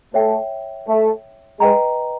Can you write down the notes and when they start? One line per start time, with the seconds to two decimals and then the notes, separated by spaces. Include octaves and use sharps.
0.14 A3 C#5 E5 G5
0.87 A3
1.60 G#3 B4 D#5 G5 A#5